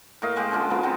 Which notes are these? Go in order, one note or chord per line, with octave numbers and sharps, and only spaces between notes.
A2 A#3 D#5 F5
G#3 A#3 G4
D3 F3 G#3 C#4
E3 F3 B3
F#3 B3 C4